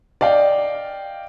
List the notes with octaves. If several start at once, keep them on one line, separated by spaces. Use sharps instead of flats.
D5 D#5 F5 G5